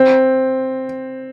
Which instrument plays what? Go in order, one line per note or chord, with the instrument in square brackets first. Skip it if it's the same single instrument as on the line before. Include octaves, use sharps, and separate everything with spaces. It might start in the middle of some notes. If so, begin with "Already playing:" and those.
Already playing: [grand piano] C4